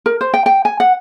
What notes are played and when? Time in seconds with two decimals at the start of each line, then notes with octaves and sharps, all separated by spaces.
0.06 A#4
0.21 C5
0.34 G5
0.46 G5
0.65 G#5
0.80 F#5